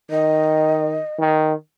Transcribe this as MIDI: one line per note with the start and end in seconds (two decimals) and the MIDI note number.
0.11 0.99 51
0.11 1.17 75
1.19 1.53 51